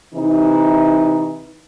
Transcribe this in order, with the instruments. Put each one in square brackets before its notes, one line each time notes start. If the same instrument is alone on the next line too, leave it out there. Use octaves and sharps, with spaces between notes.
[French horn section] C3 E3 D#4